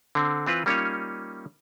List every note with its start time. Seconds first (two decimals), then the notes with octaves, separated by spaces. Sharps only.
0.15 D3 C4
0.47 E3 C4 F4 B4
0.66 G3 A#3 C#4 D#4 F4 C#5